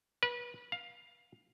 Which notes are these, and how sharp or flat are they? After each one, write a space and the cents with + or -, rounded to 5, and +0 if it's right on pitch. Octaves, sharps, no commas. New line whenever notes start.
B4 -30
F5 +10